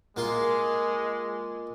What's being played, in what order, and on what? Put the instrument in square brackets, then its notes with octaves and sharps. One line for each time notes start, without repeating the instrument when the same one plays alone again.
[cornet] G#3 [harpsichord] A#3 F4 C6